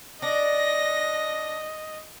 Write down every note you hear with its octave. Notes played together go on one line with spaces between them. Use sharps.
D4 D#5 A#6